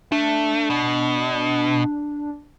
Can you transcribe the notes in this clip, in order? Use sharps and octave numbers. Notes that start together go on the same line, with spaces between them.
A3 D4
B2